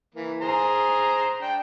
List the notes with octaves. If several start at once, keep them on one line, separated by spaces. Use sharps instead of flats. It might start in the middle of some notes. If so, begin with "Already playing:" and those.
E3 A#3
G#4 C5 A#5
D4 G5